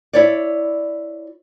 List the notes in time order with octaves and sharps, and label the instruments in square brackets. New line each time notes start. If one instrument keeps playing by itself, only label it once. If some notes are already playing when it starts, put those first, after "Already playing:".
[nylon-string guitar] E4 C#5 D5